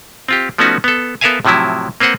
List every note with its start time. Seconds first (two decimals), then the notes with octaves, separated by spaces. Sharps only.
0.28 C4 F4 G4
0.58 F3 A3 B3 C#4 D#4 F#4
0.84 B3 A4
1.21 B3 A4 A#4 E5 F5 G#5
1.45 A2 C3 F3 F#3 E4
2.01 A#3 C4 B4 C5 F#5